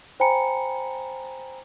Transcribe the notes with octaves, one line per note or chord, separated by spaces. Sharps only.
C5 G5 G#5 A#5 B5 C#7